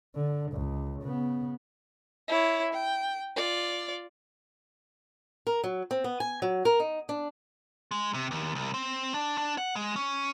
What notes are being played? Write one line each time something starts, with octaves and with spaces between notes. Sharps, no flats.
D3
C#2
C#3 B3
E4 C#5
G5
F4 D5
A#4
F#3
C4
B3
G#5
F#3
A#4
D#4
D4
G#3
C3
D#2
C2
C4
D4
D4
F#5
G#3
C#4